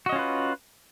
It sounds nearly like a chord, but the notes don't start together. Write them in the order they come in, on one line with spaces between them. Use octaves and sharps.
F#4 D#5 C#4 F4 B4